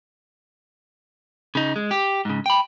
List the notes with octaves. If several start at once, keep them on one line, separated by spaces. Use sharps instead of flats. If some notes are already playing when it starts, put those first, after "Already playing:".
C#3 D#4
G#3
G4
G#2 C#3
G5 B5